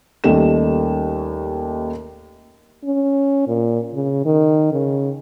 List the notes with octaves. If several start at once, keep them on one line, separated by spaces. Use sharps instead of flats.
D#2 D#3 G3 A3 C#4 E7
C#4
A#2
C#3
D#3
C#3